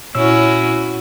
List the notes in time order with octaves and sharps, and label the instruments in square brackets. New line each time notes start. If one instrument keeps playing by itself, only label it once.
[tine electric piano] A#2 C#5 E6 [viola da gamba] C#4 E4 F#4